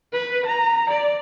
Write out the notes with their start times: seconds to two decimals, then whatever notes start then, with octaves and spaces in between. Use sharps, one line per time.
0.12 B4
0.46 A#5
0.90 D5